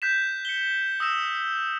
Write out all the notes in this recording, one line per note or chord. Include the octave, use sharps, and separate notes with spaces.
F#6 G6 B6 E7
C#7 G7
D#6 E6 A#6 E7